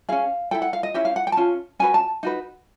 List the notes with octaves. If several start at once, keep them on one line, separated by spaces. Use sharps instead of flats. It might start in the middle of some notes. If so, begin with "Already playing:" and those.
C#4 F4 G#4 F5
E4 A4 G5
F#5
F5
D#5
C#4 E4 G4 E5
F5
F#5
G5
A5
C#4 F4
C#4 F#4 B4 G#5
A5
D#4 F#4 B4